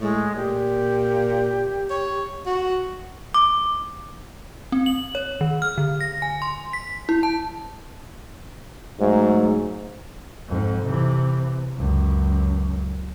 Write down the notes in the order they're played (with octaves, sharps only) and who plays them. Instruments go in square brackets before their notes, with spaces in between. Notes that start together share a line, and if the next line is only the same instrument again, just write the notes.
[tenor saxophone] A2 [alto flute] G#3
[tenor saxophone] A#2 [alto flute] G4
[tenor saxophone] C#5
F#4
[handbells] D6
[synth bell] C4
F#7
C#5
D#3
F6
D3
A#6
G#5
C6
B6
E4
A5
[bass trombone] G#2 [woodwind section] F#3 A3
[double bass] F2 G#2
C3 E3
C#2 F#2